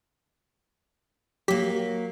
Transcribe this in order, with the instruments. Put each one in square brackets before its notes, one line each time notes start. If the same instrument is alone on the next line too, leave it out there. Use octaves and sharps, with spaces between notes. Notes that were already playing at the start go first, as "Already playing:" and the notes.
[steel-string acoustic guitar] F#3 A#3 [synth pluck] G4 B6